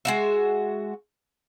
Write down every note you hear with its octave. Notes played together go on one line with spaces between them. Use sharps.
G#3 F#4 E5